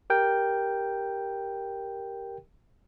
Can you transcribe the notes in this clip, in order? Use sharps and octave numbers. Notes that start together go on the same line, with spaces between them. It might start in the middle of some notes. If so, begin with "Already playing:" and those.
G4 A#4 G5